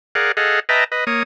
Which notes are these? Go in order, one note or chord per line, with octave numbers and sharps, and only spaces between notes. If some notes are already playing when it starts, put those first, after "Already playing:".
G#4 A#4 D5 F5 F#5
G#4 A4 D#5 F5 F#5
B4 D#5 E5 G5 A5 A#5
B4 D#5
A#3 C#5 D#6